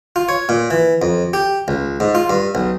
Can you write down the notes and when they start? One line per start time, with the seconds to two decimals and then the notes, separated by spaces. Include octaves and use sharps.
0.16 F4
0.29 C#5
0.49 A#2
0.70 E3
1.02 F2
1.33 G4
1.68 C#2
2.00 G#2
2.15 F4
2.30 G2
2.55 B1